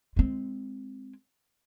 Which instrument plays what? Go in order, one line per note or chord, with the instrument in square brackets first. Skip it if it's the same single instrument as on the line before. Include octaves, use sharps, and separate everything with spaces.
[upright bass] G#3 C4